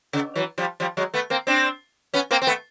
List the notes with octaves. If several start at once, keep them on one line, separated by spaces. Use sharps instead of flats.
C#3
E3 F#3
F3 G3
F3 G3
F#3 G#3
A3 B3
A#3 C4
C4 D4
B3 C#4
A#3 C4
C4
A3 B3